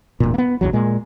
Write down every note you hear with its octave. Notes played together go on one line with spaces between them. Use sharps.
E1 A#2
A#3 B3
A#1 E2 F#3
A#2 G#3